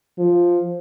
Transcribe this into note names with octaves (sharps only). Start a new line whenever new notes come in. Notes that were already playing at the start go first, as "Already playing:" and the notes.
F3